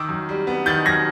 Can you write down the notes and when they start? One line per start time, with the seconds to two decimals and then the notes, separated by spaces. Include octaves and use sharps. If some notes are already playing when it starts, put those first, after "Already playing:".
Already playing: D#3 D6 E6
0.09 F#2
0.29 G3
0.47 B3
0.66 D#3 G6 A6
0.85 F#2 G#6 A#6